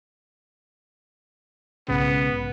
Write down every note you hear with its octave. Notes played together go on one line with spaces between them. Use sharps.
B1 G#2 C#3 B3